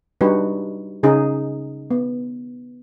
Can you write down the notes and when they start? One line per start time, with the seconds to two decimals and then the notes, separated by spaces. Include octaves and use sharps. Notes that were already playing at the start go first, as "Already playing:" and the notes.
0.21 G3 D4 D#4 F#4 B4
1.03 C#3 C#4 D#4 G#4
1.91 B3